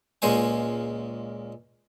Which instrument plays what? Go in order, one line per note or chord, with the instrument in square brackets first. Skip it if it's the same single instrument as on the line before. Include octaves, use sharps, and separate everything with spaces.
[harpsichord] C#2 A#2 G#3 C5 G#5